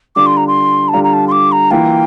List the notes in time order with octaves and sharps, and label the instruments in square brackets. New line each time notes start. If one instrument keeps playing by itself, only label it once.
[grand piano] D3 G3 D4 F4 [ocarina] D6
[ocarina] C6
A#5
C6
A5
[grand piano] D3 G3 D4 F4 [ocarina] A#5
[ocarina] A#5
A5
C6
D6
A#5
[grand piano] E3 A#3 F4 [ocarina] G5